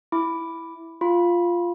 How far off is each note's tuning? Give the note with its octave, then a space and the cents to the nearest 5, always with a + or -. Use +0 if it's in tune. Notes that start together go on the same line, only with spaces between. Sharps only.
E4 +0 D6 +0
F4 +0 B5 -25